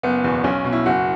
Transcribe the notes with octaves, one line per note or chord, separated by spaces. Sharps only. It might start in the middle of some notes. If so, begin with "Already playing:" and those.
F#1 B3
E2 B2
B1 C#4
B2
E4
F#1 F#4